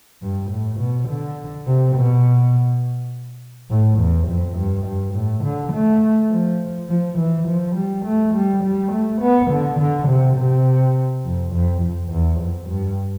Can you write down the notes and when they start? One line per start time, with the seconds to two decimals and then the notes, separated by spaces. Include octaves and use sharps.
0.22 G2
0.51 A2
0.80 B2
1.09 D3
1.67 C3
1.96 B2
3.70 A2
3.99 E2
4.28 F2
4.57 G2
4.86 G2
5.15 A2
5.44 D3
5.73 A3
6.31 F3
6.89 F3
7.19 E3
7.48 F3
7.76 G3
8.05 A3
8.34 G3
8.63 G3
8.92 A3
9.21 B3
9.51 D3
9.79 D3
10.08 C3
10.37 C3
11.25 F2
11.54 F2
11.82 F2
12.11 E2
12.41 F2
12.69 G2